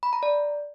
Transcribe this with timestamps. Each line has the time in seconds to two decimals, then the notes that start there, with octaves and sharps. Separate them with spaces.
0.03 B5
0.13 A#5
0.23 D5